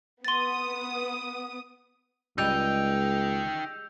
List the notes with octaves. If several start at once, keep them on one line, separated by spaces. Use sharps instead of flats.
B3 C6 D#6 A6
C#2 G3 G#3 D#4 G5 E6 G6 F7